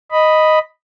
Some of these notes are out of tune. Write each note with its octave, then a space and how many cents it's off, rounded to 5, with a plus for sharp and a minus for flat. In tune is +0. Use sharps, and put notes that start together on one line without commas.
D#5 +0 B5 +0